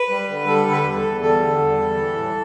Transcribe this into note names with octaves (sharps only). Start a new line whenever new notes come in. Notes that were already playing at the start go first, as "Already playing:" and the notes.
Already playing: B4
G3
D3
G3 A4
D3
B4
E2
A4
E2
G3 A4
D3
E2
G3
E3
A2